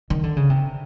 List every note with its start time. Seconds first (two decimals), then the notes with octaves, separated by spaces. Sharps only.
0.10 D#3
0.24 D3
0.37 C#3
0.50 C3